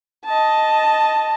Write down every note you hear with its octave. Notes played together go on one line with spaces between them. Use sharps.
D#5 A5